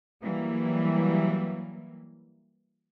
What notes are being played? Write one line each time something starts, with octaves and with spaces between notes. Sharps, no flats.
E3 F#3 G3 A#3